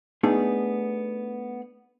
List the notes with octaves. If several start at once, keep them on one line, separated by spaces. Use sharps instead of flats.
A3 B3 D4 D#4 G#4